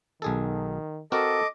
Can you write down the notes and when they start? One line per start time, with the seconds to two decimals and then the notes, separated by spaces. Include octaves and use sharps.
0.22 B1 D#3 G#4 A4
1.12 C4 F#4 A4 A#4 D#5 D6